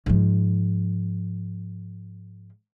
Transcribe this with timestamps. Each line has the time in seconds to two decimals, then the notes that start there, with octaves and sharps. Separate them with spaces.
0.06 G#2 F3